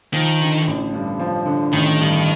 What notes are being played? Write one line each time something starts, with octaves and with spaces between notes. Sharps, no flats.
D#3 F3
D3
A1
G2
F3
D3
A1 D#3
G2